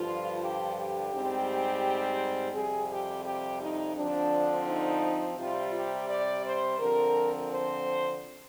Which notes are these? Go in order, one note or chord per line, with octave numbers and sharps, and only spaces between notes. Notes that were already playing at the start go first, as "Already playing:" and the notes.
Already playing: G2 D3 F3 F4
G4
G4
G#2 G3 C4
F2 C3 G3 G#4
G4
G4
D#4
D3 F3 C4 D4
D#4
C3 G3 C4 F4
G4
D5
C5
D3 F3 C4 A#4
C5